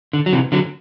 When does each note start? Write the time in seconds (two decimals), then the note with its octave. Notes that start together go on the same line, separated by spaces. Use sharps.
0.13 D3
0.26 F#3
0.33 C3 E3
0.52 D3 F#3